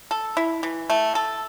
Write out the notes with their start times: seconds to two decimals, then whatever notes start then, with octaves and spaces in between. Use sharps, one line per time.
0.11 A4
0.37 E4
0.63 E3
0.90 A3
1.15 A4